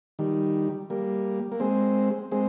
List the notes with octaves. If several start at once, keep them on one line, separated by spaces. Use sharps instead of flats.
D#3 G3
G3 A#3
A#3
G#3 C4
G#3 C4